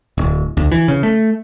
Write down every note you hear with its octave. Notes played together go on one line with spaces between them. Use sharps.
D1
D2
E3
C#3
A3